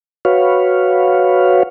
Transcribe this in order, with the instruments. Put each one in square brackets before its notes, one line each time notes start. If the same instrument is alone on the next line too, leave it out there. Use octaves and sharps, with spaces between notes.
[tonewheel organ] F#4 B4 C#5 F5